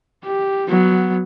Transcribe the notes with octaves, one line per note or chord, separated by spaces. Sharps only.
G4
F#3 B3